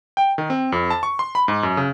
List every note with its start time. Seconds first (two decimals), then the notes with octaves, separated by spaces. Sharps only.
0.17 G5
0.38 D#3
0.50 C4
0.72 F2
0.90 A5
1.03 C#6
1.19 C6
1.35 B5
1.48 G#2
1.63 F#2
1.77 C#3